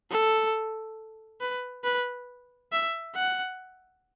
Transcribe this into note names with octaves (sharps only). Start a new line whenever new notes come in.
A4
B4
B4
E5
F#5